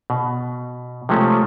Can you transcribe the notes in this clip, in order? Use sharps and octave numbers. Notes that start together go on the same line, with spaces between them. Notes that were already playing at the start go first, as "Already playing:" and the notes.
B2
C3 F3 G#3 A3 C#4